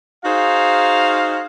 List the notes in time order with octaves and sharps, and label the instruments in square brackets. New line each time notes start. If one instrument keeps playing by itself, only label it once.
[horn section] D#4 F#4 G#4 C5 F5